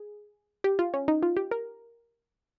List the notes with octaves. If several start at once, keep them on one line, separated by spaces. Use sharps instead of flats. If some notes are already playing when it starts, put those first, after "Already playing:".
Already playing: G#4
G4
F4
C#4
D#4
F4
G4
A#4